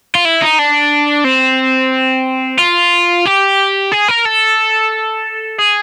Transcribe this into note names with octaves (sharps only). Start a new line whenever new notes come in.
F4
E4
D#4
D4
C4
F4
G4
G#4
A#4
A4
G#4